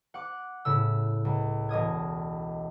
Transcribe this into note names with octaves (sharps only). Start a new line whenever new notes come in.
F#5 D6
A2 C#3 E6
C#2
E1 D#5 D#6 G#6